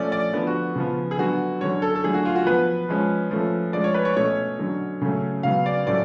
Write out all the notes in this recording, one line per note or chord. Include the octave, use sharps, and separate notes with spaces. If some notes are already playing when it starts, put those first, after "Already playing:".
Already playing: F3 A3 C#4 D5
D5
D3 F3 B3
F#4
C#3 F3 B3
G#4
D3 F#3 B3 F#4
D3 F#3 C#4 C#5
A4
A4
D3 F#3 A3 G#4
F#4
F4
F#4
F3 B3 B4
F3 G#3 C#4
F3 A3 C#4
F3 G#3 C#4 D5
C#5
B4
C#5
B2 A3 C#4 C#5
D3 F#3 C#4
C#3 F#3 A3 C#4
C#3 F#3 B3 F5
D5
A2 F#3 A3 C#4 D5